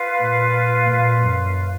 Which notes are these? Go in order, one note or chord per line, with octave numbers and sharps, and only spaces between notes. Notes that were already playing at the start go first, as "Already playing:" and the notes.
Already playing: F4 B4 F5
A#2
A#2
F#2